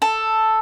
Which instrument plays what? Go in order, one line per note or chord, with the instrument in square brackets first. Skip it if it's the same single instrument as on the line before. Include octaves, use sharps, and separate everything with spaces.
[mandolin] A4